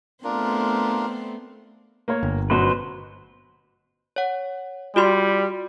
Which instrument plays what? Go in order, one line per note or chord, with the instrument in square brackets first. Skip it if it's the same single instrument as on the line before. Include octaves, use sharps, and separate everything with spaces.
[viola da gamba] A3 B3 C4 [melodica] D4 F4 A#4
[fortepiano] A#3 A#4 C#5
[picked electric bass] G1
[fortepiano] F#2 B2 [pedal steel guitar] B4 C5
[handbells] C#5 F#5
[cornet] G3 [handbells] F4 F#4 C6